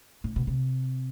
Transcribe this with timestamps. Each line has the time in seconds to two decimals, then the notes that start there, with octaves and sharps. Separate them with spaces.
0.24 A2
0.36 B2
0.47 C3